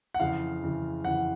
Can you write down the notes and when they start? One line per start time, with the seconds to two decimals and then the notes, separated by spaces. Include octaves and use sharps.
0.14 F#5
0.20 F2 C#3 E3 F5
0.63 F2 C#3 E3
1.04 F2 C#3 E3 F#5